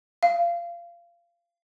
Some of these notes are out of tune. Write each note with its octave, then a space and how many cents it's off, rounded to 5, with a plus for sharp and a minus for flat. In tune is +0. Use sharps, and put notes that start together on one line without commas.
F5 -25